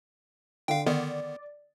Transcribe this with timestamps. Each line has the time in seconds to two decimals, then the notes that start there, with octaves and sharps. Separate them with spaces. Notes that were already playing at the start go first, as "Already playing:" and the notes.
0.68 D3 F5 G5
0.86 D3 D#3 B3 D5